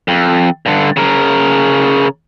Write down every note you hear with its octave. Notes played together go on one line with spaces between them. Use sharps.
F2
G2 D3
C#3 A#4